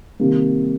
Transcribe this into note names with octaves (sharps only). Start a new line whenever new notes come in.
C3 D#3 G3 A#3